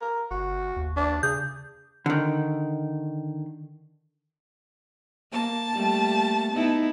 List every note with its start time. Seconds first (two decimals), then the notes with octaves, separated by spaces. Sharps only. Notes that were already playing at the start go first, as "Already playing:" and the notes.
0.01 A#4
0.31 G1 F#4
0.77 D#2
0.96 D4
1.23 C#3 G#4 G6
2.06 D3 D#3
5.32 A#3 A5
5.74 G3 A3 A#3
6.52 B3 D#4 E4